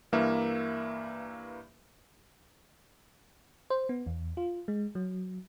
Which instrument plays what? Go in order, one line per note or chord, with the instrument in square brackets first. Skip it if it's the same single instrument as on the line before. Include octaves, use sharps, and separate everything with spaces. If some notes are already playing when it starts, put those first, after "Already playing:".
[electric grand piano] G2 E3 A#3 A#4 E5
[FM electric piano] C5
B3
E2
F4
G#3
F#3